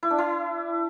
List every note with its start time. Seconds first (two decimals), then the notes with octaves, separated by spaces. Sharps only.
0.03 E4
0.10 D4
0.18 E4